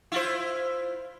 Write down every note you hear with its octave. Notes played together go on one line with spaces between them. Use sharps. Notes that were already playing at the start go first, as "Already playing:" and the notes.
E4 F4 C5